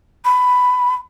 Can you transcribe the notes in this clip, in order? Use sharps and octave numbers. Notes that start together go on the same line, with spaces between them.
B5